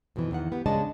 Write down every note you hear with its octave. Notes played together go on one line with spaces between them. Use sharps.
F2 B2 D#3 E3
E2 D#3 F#5
B3 G4
C#3 G#3 D4 C#5 D#5 A5